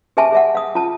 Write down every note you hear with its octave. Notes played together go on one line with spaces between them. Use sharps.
G4 G#4 E5 G#5 A5 C#6
G#4 E5 F#5
F5 D#6
F4 A5